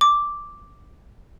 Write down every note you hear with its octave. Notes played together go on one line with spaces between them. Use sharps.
D6